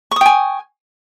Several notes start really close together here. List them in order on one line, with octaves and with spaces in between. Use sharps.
C#6 D#6 G5 G#5